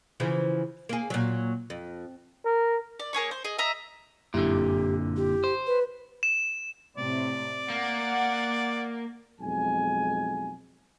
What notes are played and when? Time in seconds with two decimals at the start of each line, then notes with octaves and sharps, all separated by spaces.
0.20 C#3 E3 F3
0.89 A#3 G#4
1.10 A#2 F#3
1.70 F2
2.45 A#4
3.00 D5
3.13 A#3 G#4 C#5 C#6
3.31 C5
3.45 G#4 D#5
3.58 D#5 E5 A#5
4.34 G1 F#2 A#2 D3 E4 G4
5.16 G4
5.44 C5
5.67 B4
6.23 E7
6.98 A2 C3 D5
7.70 A#3 F#5
9.41 B1 F2 G#3 G#5